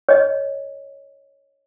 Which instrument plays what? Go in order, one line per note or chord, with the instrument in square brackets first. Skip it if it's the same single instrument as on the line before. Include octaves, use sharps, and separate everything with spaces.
[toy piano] C#5 D#5